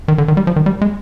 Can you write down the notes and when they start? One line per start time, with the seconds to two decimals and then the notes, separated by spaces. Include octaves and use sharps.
0.08 D#3
0.18 D3
0.28 D#3
0.37 G3
0.47 F3
0.56 D#3
0.66 G3
0.82 G#3